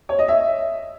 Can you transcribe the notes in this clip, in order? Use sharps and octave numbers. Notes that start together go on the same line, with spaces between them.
C#5
D#5
E5